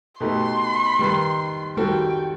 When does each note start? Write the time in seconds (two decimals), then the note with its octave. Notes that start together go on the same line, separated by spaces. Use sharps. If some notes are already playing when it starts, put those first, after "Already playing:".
0.20 B2 A3 D#4 G4 B4 C6
0.99 D#3 G3 D#4 G4 B4
1.77 D#3 G3 C4 F#4 A4 G5